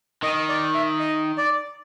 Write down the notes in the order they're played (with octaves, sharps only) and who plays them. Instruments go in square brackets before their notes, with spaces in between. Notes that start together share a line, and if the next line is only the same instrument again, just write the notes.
[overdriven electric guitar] D#3 [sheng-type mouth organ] D#5
[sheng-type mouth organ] D5
E5
D#5
D5